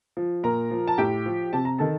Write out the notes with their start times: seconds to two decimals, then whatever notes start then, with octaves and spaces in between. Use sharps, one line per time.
0.17 F3
0.44 A#2 A#4 A#5
0.71 F3
0.87 A5
0.98 A2 G4 G5
1.26 F3
1.53 C3 A5
1.65 A#5
1.79 D#3 A4 A5